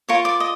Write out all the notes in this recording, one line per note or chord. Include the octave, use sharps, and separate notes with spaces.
F4 A#4 C#5 C#6
D5 D6
D#5